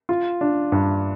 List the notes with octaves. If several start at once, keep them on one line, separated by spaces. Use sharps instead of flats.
F4
D4
G2